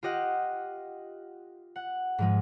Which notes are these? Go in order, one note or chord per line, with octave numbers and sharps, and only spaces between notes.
F4 G4 D#5 F#5
F#5
G#2 F3 G#3